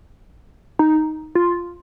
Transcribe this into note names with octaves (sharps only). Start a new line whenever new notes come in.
D#4
F4